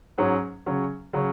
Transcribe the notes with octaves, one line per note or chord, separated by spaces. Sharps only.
G#2 F#3 C#4 G#4 C#5
C#3 F#3 C#4
C#3 F#3 C#4